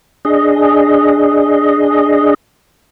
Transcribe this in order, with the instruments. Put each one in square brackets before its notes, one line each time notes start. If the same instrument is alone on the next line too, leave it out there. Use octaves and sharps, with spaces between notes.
[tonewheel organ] D4 G#4 D#5